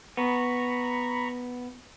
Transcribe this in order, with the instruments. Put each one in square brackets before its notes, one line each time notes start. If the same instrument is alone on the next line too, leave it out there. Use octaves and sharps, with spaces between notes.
[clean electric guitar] B3 [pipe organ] A#5 B5 C#6